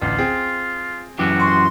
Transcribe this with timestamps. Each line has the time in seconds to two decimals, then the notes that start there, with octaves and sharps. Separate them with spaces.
0.02 A1 D2 F4
0.18 C4 G#4
1.19 F#2 E3 F#4 G4
1.40 C6 C#6